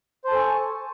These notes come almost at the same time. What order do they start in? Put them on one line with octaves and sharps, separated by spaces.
C5 A5 A4 G#5 C#6